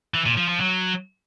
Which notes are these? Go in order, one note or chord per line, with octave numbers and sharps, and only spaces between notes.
E3
A#2
F3
F3
F#3